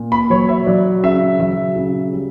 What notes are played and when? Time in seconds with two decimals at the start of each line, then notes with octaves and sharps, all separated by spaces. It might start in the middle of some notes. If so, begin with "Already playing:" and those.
Already playing: A#2
0.12 B5
0.30 F#3 C#5
0.49 E5
0.66 F#3 D5
1.03 C#3 E5
1.39 F#3 E5
1.76 C#3
2.13 G3